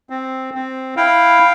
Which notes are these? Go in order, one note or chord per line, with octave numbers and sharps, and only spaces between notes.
C4
C4
E4 F5 G5